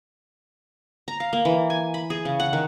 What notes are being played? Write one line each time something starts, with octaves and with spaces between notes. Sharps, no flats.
A#5
F5
A#3
E3
G#5
B5
G#4
C#3
F#5
D#3